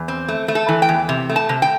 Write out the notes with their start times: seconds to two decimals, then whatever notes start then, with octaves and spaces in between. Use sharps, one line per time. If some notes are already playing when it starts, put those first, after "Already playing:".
Already playing: E2
0.08 C4
0.28 A3
0.48 A3
0.55 A4
0.69 E3
0.82 G5
0.89 E2
1.09 C3
1.29 A3
1.36 A5
1.49 C3
1.62 G5